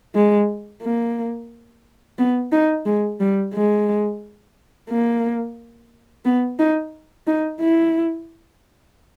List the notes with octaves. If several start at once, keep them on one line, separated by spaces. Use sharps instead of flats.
G#3
A#3
B3
D#4
G#3
G3
G#3
A#3
B3
D#4
D#4
E4